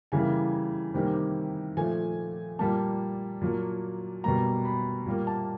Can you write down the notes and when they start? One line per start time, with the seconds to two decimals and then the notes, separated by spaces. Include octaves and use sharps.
0.12 C#3 E3 G3 A#3 G#5
0.94 C3 D#3 G3 A#3
1.77 A#2 F3 A3 G#5
2.59 A#2 G3 A#3 A5
3.41 A#2 F#3 A#3
4.24 B2 G3 A#3 A#5
4.65 B5
5.06 A#2 G3 A#3
5.27 A5